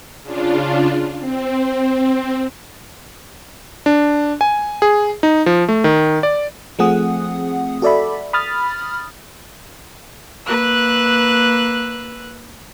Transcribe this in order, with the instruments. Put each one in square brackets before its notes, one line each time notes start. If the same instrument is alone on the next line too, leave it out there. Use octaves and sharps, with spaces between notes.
[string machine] C#3 D4 F4
C4
[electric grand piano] D4
G#5
G#4
D#4
F3
A3
D#3
D5
[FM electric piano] F3 A3 C4 G#4 F#5 D#6
F#4 A4 D5 E5 B5
B5 D#6 F6 A6
[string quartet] A#3 B4 E6 F#6